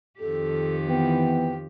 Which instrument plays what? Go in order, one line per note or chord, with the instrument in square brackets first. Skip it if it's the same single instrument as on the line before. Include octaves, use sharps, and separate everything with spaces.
[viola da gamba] F2 D#3 G4 [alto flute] A4
[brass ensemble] E3 B3 [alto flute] G5